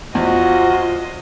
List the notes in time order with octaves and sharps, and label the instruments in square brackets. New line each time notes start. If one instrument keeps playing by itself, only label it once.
[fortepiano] E2 [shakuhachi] F4 [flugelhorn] F#4 [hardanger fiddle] C5 D#5